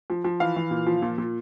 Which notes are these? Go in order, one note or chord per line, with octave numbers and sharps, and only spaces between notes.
F3
F3
E3 F5
E3
A#2
F3
A#2
A#2